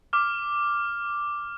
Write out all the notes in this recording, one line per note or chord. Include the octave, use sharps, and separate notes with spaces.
D6 F6